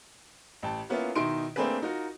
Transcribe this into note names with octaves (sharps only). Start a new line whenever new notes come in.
A1 G5 A5
A#3 B3 C#4 E4 F4
B2 D#3 D#4 E4 C6 D7
A3 A#3 C4 D4 G#4 B4
D#4 F4 F#4 A#4